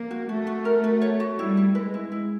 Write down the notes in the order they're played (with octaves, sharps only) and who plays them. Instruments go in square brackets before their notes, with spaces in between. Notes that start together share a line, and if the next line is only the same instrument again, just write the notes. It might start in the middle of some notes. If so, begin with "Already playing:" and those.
Already playing: [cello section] A#3
[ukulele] F#4
[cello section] A3 [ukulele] F#4
[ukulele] F#4
A#4
F#4
C#5
F#4
[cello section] G3 [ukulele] E4
[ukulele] E4
[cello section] G#3 [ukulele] B4
[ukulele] E4
E4